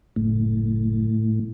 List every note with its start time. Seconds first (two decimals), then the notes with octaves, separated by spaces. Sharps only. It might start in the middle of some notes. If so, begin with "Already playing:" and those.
0.16 F#1 A2